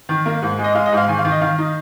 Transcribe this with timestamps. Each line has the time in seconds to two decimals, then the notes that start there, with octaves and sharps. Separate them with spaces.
0.09 D#3
0.25 A#3
0.42 G#2
0.59 G#3
0.64 D#5
0.75 G#3 F5
0.86 D#5
0.92 G#2 F5
1.08 D#3 G#5
1.19 F5
1.25 D#3
1.31 D#5
1.41 D#3 F5
1.58 D#4